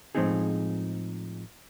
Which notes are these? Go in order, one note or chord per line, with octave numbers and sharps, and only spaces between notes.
A2 F3 G#3 C4 D#4 G#4